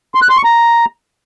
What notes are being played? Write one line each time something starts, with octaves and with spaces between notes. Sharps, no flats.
C6
F#6
C6
C#6
A#5